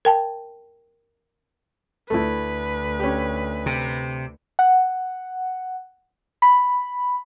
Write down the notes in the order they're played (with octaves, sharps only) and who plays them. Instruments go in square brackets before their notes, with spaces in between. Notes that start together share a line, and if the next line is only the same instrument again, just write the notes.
[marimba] A#4 G5 A5
[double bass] D2 [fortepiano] A3 E4 [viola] B4
[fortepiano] C#4 G4
[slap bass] C3
[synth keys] F#5
B5